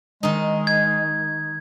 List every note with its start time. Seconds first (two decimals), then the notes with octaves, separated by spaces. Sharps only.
0.23 D#3 G#3 D#4
0.67 G#6